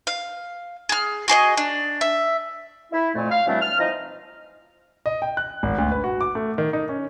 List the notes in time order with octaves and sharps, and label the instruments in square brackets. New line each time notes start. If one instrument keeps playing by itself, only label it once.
[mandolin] F5
G#4 F6
F#4 G#4 D5 D#5
D4
E5
[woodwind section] E4
F2 A#2 A3
F5
E3 F#3 G3 A3 C4 D4
F6
E3 F3 D#4 D#5
[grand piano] D#5
G5
F#6
G#1
D2
B4
F#4
D6
A3
D#3
D#4
C#4